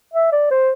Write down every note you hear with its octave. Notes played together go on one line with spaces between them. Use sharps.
E5
D5
C5